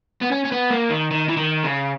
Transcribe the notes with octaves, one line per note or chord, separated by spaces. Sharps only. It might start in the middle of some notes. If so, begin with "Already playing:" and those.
B3
C#4
C#4
B3
A#3
D#3
D#3
E3
D#3
C#3